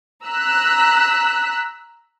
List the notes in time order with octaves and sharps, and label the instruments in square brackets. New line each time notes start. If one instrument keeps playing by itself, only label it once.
[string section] A#5 E6 F#6 B6